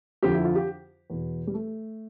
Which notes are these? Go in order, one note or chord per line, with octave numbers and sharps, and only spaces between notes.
F2 D3 F3 G4
E4
F4
G4
E2 B2
G3
A3